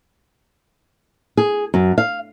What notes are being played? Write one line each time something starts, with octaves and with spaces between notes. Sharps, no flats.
G#4
F#2
F5